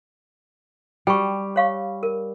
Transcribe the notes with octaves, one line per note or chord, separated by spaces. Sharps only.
G3 G5 C#6
C#5 F5 C#6
A#4